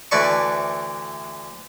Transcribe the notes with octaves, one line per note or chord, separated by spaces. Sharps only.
D2 E3 B4 D5 A5 C#6